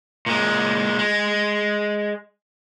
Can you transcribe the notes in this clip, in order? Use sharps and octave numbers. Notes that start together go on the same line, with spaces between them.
A#2 G#3
G#3